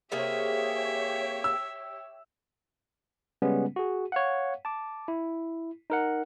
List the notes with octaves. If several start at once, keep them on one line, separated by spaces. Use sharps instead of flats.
C3 A#3 G4 G#4 C#5 E5
E6
C#3 G3 G#3 B3 C#4
F#4 G#4
C#5 F5 F#5
A5 D6
E4
D#4 A#4 F#5